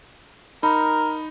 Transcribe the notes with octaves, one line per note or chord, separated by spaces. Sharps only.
D#4 A#4 B5